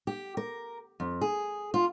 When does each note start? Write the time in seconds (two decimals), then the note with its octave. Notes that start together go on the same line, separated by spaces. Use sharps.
0.07 G4
0.37 A#4
1.00 F2
1.21 G#4
1.74 F4